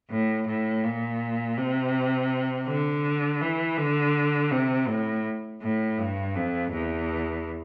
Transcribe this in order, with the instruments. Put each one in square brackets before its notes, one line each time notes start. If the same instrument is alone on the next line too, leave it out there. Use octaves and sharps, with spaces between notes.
[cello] A2
A2
A#2
C3
D3
E3
D3
C3
A2
A2
G2
F2
E2